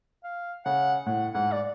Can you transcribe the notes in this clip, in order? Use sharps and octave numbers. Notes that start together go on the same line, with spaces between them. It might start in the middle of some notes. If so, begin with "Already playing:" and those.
F5
C#3 F#5
A2 F#5
G#2 F#5
D5